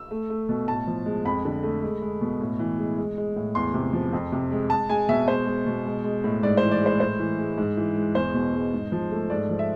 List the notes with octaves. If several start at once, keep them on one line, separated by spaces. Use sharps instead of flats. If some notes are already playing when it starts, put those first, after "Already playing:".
Already playing: E6
A3
A3
B2
A2 A5
F3
G#3
F2 B5
D3
A3
G#3
G#3
B2
A2
E3
G#3
G#3
G#3
A2
E2 C6
C3
F3
F2
C3
G#3
G#3 A5
G#3 G#5
B2 E5
G#3 C5
G#3
B2
G#3
G#3
A2
G#2 D5
C5
E3
D5
G#3 C5
A2 C5
E3
G#3
G#2
E3
G#3
E2 C5
B2
G#3
G#2
F3
A3
G#2 D5
F3
E5